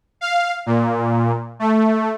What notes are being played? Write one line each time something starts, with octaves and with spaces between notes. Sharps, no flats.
F5
A#2
A3